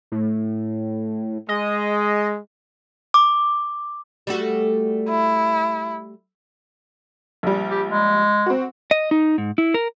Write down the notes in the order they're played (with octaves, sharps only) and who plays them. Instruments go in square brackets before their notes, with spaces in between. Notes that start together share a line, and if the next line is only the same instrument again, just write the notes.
[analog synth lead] A2
[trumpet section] G#3 [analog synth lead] D#5
[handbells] D6
[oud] G3 A3 F#4
[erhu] E4
[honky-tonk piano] A#1 G3
[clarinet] G4
G#3
[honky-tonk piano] C4 F#4
[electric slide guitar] D#5
D#4
G#2
E4
A#4